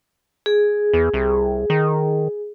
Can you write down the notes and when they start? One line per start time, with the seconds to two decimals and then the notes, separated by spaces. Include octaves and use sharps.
0.46 G#4
0.94 E2
1.14 C2
1.70 D#3